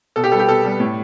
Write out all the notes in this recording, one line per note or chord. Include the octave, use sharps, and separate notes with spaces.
B2 A4
G4
G3 B3 A4
G4
B2 A4
G3 B3
A2